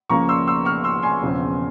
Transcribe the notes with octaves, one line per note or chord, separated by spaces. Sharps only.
C#2 C#3 F3 A#3 A#5 C#6
C6 E6
C6 E6
C#6 F6
C6 E6
G#5 C6
E1 E2 C#3 F3 C4